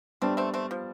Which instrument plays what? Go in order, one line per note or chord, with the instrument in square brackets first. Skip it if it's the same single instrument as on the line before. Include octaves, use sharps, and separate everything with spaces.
[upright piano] G3 B3 D4 [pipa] A3 C4
[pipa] A3 C4
A3 C4
F3